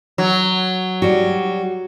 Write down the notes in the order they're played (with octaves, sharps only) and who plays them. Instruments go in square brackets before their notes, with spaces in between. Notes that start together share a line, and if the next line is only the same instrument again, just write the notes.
[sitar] F#3
[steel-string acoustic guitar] G3 F#4